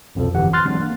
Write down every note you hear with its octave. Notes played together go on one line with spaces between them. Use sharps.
C2 F2 B2 F3 A4
G1 E3 G4 F#5
C6 F6 F#6 A6
E3 F#3 G#3 C4 D4
A#3